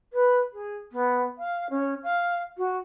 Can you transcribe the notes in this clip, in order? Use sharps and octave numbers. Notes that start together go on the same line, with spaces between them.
B4
G#4
B3
F5
C#4
F5
F#4